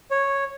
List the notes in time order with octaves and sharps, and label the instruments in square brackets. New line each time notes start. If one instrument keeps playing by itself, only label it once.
[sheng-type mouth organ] C#5